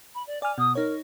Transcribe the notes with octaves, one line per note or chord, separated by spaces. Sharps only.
B5
D5
D5 G#5 F6
B2 D#6
D#4 A#4 C#5